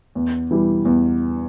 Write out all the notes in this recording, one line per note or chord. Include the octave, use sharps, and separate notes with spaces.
E2
E3 G3 E4
E2